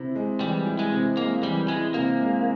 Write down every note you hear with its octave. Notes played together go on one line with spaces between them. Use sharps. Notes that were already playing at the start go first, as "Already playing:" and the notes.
Already playing: C3 E4
G#3
E3 G3
E4
G#3
C3
G#3 A#3
E3 G3
G#3 E4
C3 A#3
G#3